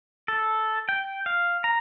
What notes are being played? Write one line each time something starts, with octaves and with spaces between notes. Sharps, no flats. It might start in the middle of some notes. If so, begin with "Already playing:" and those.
A4
G5
F5
A#5